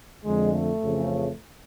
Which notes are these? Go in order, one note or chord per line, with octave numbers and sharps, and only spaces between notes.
F2 D3 G#3
A3
F2 C#3 E3